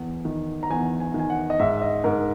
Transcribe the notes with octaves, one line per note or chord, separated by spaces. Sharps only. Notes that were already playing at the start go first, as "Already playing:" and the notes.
Already playing: E2
D#3
A#5
E2 G#5
G#5
D#3
G#5
F#5
D#5
G#2 E5
E5
D#5
G#2 A#4